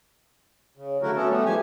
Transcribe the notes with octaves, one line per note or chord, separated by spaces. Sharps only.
C#3
D3 F#3 A3 E4 F#4 A#4
A3 B3 C#4 F#4 A4
G3 A3 B3
G#2 F3 G4 G#5